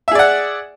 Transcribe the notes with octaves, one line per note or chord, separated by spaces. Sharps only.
G#4 D5 E5 F#5